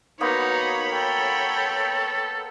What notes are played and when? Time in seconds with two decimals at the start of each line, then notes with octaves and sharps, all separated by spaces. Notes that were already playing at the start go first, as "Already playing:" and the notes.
0.21 A#3 B3 D#4 F#4 C5 C#5 B5
0.92 A4 G5